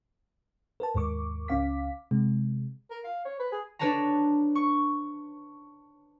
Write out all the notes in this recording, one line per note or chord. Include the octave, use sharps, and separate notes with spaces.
A#4 B4 A5
D#2 G#2 A#4 C#6 D6
C#2 C#4 F5 D6 B6
C3 G#3
A#4
F5
C#5
B4
G#4
D4 B4 C#5 A5 A#5
C#6